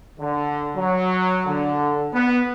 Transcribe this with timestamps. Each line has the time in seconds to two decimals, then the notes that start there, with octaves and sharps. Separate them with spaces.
0.20 D3
0.77 F#3
1.46 D3
2.14 B3